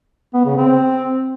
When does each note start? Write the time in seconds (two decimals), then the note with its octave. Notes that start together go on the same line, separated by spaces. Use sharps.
0.34 B3
0.46 C#3
0.57 C4